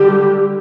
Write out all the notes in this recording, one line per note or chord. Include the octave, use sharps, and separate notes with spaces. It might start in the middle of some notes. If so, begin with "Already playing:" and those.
Already playing: D3 G3 G4